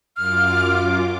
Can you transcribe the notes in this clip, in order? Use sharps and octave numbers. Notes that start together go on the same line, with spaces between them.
F#2 F4 D6 F6